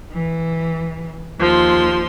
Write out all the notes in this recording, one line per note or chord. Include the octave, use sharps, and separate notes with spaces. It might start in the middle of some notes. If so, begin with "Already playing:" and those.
E3
D#2 F3 C6